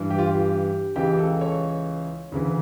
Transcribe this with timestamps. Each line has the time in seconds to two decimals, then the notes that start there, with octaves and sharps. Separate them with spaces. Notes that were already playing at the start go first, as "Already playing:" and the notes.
Already playing: G2 E3
0.10 G4
0.18 F4
0.28 G4
0.96 C#2 C#3 E3 G4
1.19 A4
1.41 C#5
2.32 D2 C#3 E3